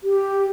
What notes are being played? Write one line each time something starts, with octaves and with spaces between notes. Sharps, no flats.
G4